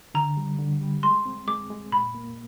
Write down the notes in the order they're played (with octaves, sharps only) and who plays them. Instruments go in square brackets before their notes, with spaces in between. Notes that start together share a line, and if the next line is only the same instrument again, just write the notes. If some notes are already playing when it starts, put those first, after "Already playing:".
[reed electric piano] D3 [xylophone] A#5
[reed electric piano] G3
D3
G3
[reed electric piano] G#3 [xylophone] C6
[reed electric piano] C4
[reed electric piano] G#3 [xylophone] D6
[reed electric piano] G#3
[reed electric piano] A#2 [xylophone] B5
[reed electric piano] A#3